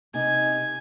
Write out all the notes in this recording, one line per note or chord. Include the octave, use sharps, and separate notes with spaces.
C3 D#4 G#5